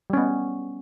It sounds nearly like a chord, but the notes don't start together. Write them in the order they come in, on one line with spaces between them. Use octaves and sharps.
G3 C#4 B3